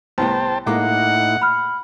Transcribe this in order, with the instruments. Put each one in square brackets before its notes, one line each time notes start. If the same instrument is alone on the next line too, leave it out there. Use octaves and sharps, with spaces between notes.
[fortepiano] C2 A2 B3 [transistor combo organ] C5 G5 A5
[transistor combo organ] A2 D#4 E4 [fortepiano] G#3 A#3 D6 [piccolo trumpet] F#5
[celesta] B5 F6